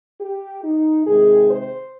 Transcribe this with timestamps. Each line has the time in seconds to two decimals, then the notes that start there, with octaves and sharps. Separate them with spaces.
0.20 G4
0.64 D#4
1.06 C3 D#3 G#3 G#4
1.50 C5